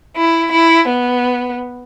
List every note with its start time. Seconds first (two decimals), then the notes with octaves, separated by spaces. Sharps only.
0.16 E4
0.52 E4
0.88 B3